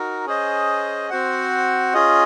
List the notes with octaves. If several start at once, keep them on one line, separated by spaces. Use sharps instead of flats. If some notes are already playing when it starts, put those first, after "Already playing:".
Already playing: D#4 F#4 A#4
C#4 G#4 C5 D#5
C4 F#4 C5 F#5
C#4 F4 G#4 D#5